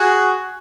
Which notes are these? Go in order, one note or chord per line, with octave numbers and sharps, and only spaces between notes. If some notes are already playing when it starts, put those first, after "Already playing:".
Already playing: F#4 G#4